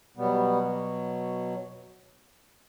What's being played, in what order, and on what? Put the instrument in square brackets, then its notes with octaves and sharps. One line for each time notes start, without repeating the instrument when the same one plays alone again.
[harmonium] B2 F#3 G3 B3